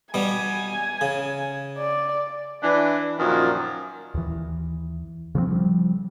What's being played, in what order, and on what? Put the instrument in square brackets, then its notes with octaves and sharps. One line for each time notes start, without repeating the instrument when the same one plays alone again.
[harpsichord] B2 G3 [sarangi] G#5
[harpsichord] C#3
[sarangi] D5
[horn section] E3 D4
F#2 A#2 D#3 F3
[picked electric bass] D#2 E3
C#3 F3 A3 C4
F3 G3